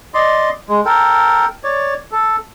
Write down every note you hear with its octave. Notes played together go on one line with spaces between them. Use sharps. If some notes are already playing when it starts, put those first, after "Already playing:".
D5 D#5 C6
G#3
A4 A#4 G5
C#5 D5
A4